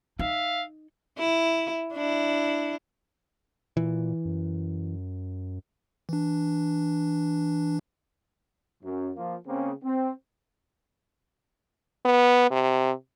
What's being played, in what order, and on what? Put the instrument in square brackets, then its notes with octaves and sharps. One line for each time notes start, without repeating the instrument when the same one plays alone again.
[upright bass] D#4 [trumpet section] E5 F5
[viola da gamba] E4
D4 E4
[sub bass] A#2 [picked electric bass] E3
[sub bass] F#2
[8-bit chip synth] E3 D4
[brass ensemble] F#2
F3 A#3 F4
C#3 A#3 C4
C4
[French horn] B3
C3